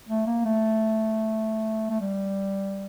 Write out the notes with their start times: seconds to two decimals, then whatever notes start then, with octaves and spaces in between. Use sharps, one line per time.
0.09 A3
0.26 A#3
0.45 A3
1.90 A3
2.00 G3